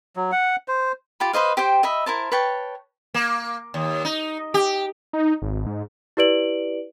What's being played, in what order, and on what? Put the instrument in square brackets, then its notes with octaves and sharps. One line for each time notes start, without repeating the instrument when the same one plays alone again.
[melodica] F#3
F#5
C5
[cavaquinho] F4 G4 B5
B4 C5 D#5 F5
G4 C5 G5
D#5 E5 B5
E4 A#4 C5 A5
B4 C#5 G5 A5
[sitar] A#3
D#2
D#4
G4
[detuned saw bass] D#4
G#1
G#2
[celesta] E4 G4 B4 D5 D7 F#7